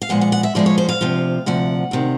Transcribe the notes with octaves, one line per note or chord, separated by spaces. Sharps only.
F5
A#2 F3 G#3 B3 F#5
F#5
F#5
E5
A#2 F3 G#3 B3 D5
C#5
C5
F5
D2 C3 F3
D2 C3 F3 F#5
D2 C3 D#3